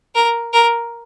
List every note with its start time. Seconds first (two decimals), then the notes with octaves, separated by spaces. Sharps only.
0.15 A#4
0.53 A#4